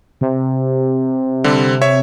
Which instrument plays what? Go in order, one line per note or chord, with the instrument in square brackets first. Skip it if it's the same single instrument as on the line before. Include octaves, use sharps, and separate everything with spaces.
[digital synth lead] C3
[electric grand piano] D3 G3 C4
C#5 E5